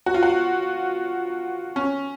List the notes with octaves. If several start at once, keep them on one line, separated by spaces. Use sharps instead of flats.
F#4
F4
F#4
C#4